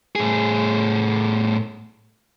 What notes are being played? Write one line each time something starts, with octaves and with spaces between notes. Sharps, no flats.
A2 G#4